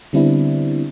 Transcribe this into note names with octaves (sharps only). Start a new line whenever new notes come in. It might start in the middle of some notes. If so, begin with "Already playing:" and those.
D3 G3 B3 C4 D4 E4